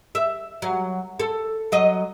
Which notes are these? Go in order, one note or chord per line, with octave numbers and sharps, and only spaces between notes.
E5
F#3
A4
F#3 D#5